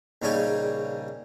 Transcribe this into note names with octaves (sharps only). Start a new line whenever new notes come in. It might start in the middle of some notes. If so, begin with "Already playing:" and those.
A#1 C#3 G3 C#4 D#4 G#5